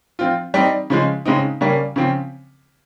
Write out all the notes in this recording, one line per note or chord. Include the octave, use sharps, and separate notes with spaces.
F3 C4 F4
G3 C4 D#4
C#3 F3 G#3
C#3 G#3 C4 D#4
C#3 G3 A#3 C#4
C#3 F3 C4